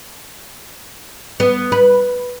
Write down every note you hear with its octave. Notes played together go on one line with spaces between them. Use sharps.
B3
B4